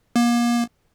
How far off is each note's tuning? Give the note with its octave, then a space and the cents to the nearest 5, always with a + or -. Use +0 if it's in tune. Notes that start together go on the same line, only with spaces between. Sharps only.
A#3 +35